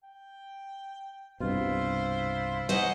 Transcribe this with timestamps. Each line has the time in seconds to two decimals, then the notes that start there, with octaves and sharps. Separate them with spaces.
0.04 G5
1.40 C2 G2 B2 E4 F4 C5
2.69 D#4 C5 C#5 D#5 F#5 G#5